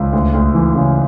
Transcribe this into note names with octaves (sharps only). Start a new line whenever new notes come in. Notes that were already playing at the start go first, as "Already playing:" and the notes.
Already playing: C#2
D2
D2
E3
C#3